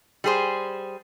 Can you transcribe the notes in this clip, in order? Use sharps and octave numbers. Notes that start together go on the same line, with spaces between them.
G3 G#4 C5